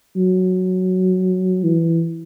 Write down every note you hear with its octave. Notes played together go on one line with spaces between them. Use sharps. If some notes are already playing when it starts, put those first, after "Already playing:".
F#3
E3